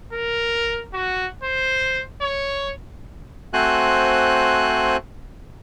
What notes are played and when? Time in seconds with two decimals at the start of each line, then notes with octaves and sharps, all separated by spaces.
0.13 A#4
0.94 F#4
1.43 C5
2.21 C#5
3.54 A3 C4 F#4 C5 G#5 F#6